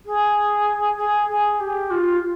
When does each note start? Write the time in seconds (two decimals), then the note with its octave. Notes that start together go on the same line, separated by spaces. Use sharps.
0.06 G#4
0.98 G#4
1.29 G#4
1.60 G4
1.90 F4